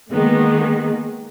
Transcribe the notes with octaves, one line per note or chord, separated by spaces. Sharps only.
D#3 G#3 A#3 B3